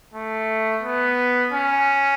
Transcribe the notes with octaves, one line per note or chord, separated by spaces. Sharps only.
A3
B3
C#4